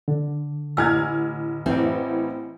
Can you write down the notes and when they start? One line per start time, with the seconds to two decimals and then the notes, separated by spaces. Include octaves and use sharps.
0.08 D3
0.77 A1 E4 G#5 E6 F6 G#6
1.66 A1 E3 C4